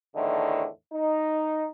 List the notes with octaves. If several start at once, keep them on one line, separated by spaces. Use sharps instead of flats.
E2 A2 D3 D#3
D#4